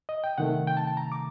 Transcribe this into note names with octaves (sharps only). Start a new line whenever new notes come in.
D#5
G5
C3 D#3 A3 F#5
G5
A5
A5
A#5
D6